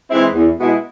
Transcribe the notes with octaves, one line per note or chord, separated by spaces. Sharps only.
E3 G#3 C4 E4
E2
B2 G#3 B3 E4